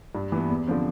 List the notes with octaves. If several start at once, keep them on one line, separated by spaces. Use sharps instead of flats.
G2
E3 B3
E2
D3 F3 C4